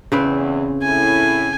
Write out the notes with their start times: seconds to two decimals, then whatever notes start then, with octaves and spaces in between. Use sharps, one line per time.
0.12 E2 C#3 C4 B4
0.83 A2 E4 G#5